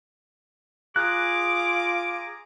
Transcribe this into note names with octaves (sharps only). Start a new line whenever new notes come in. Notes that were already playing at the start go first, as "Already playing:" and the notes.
F4 G#4 A#5 D6 F#6